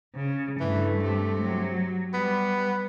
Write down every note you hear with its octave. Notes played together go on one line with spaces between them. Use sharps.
C#3
G2 E3 A3
C3
F#3
G3 B3